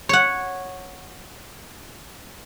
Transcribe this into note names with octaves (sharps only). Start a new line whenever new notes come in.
C#5 F#5